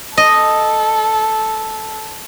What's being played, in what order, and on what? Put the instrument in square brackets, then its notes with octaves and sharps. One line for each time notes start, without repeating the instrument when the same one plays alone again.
[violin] A4 [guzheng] D#5